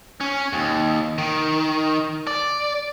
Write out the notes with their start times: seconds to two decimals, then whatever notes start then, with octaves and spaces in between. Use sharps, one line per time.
0.20 C#4
0.53 D#2
1.18 D#3
2.27 D5